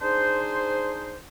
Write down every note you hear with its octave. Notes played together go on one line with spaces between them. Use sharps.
D4 D#4 G#4 C5